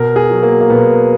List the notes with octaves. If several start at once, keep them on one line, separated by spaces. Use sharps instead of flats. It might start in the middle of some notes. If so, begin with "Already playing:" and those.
Already playing: B2 A#4
G#4
F#3
A#3
A#3
B2 B3